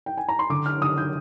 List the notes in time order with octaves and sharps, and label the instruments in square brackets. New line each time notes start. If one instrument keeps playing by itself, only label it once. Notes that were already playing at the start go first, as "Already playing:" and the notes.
[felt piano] G5
G#5
A#5
C6
D3 D6
F6
D3 D#6
G6